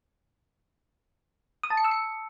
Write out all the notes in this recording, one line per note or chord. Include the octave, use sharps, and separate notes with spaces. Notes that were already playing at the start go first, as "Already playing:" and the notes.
D#6
A5
C#7
E6
C#7